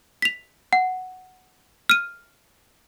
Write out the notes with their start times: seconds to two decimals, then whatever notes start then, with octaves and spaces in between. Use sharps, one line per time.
0.22 B6 F7
0.73 F#5
1.89 F6 D#7